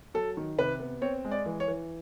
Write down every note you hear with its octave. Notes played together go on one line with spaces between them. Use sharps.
F#3 A4
D#3
C3 B4
B3
C4 C#5
G#3
D5
E3
C#5
E3